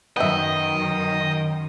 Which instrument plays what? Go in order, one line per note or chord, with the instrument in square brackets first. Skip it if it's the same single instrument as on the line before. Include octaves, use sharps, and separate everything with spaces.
[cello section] F#2 D#3 [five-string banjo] B3 E5 [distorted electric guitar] D#5 [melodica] G5